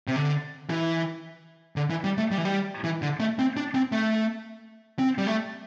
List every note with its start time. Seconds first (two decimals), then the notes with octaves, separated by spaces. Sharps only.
0.08 C3
0.16 D3
0.70 E3
1.76 D3
1.90 E3
2.04 G3
2.18 A3
2.31 G3
2.38 E3
2.45 G3
2.84 E3
3.02 D3
3.20 A3
3.39 C4
3.57 D4
3.74 C4
3.92 A3
4.99 C4
5.18 G3
5.27 A3